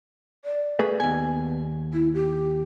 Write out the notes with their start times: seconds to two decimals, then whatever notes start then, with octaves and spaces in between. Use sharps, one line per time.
0.45 D5
0.79 A3 G#4 B4
1.00 D#2 B3 G#5
1.93 E4
2.14 G4